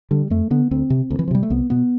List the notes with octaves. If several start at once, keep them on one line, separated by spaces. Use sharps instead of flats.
D3 G3
F2 A3
D3 B3
D2 C4
C3
D2
E3
F3
C3 G3
A3
C2 B3
B2 B3